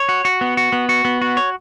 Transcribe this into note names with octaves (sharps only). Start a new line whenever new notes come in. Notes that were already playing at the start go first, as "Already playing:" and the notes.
Already playing: C#5
F#4
F#4
B3
F#4
B3
F#4
B3
F#4
C#5